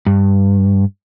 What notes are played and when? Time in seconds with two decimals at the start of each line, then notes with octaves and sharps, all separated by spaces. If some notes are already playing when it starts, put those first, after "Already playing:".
0.06 G2